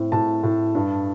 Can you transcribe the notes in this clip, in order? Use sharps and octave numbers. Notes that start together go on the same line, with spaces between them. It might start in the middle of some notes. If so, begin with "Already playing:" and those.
Already playing: A2 C4
A2 A5
A2
G2